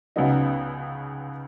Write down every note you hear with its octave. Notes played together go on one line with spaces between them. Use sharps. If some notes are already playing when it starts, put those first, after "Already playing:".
C#2 C#3 F#3 B3 D#4